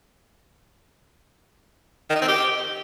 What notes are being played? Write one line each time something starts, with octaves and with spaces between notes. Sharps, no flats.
D#3
D#4
C4
G4